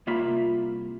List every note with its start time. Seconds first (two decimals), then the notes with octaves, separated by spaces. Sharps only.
0.07 C2 A#3 F4 E5 B5